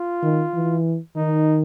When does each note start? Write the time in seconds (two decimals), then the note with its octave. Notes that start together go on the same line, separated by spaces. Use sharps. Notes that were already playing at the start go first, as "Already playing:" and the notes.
Already playing: F4
0.23 D#3
0.54 E3
1.17 D#3 D#4